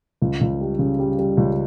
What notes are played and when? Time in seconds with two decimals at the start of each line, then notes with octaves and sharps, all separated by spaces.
0.22 C#2
0.41 C#2
0.61 G3
0.79 C#3
0.99 G3
1.19 G3
1.37 C#2